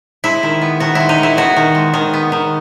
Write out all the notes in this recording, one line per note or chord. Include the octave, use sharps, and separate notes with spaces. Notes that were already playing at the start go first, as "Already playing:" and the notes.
G#3 E4
D#3
B3
D#3 F#4
G#3 E4
D#4
D#3
E4
B3 F#4
D#3
G#3
D#3
B3
D#3